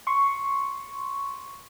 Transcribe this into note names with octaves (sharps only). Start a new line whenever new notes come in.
C6 C#6